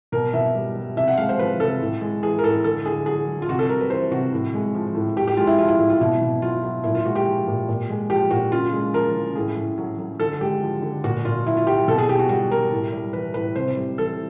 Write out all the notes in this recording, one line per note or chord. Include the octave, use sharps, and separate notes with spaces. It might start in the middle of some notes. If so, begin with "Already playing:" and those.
B2 A#4
B2 E5
G3
G3
C3 E5
F#5
G#3 F5
C5
F3 B4
C3 A4
A2
G#3
E3 G#4
A#4
A2 A4
D3 A4
D3 G#4
F#3 G#4
F#3
F4
C3 F#4
A4
G3 A#4
B4
E3 C5
C3 F#4
A2
G#3
F3
A2
A2 G4
G4
G#3 F4
E4
F3 F4
E4
A2
F4
B2 E4
B2
F#3 F4
F#3
A#2 E4
F4
G#3 F#4
G4
F3
A#2
A#2
G#3
F3 G4
A#2 F#4
C#3 F4
G#3
F3 A#4
C#3
A2 G#4
A2
F#3
F#3
D3 A4
G#3 G4
F3
D3
A#2 F#4
A#2 F4
F#3 E4
F4
F#3 G4
B2 A4
G#4
B2 G4
F#4
G3 F#4
G3 A#4
A2
G3
E3 B4
A2 B4
C3 C5
G3
E3 A4